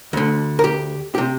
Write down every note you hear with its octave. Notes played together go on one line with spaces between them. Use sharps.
D2 D3
A#4
G4
C3 G4